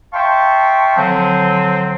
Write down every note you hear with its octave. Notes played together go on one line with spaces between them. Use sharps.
E5 F5 G5 A5 C6 C#6
D3 F3 F#3 C4